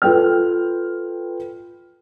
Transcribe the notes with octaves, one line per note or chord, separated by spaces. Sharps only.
F4 A4 B4 G5 F6